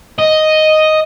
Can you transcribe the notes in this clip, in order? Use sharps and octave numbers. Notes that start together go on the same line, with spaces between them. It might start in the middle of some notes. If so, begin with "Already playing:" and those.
D#5